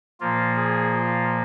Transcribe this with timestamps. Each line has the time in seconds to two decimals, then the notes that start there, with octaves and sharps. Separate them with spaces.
0.20 A#2 F3 A#3 F4
0.56 G#4
0.92 F4